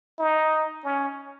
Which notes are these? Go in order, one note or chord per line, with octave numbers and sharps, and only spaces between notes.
D#4
C#4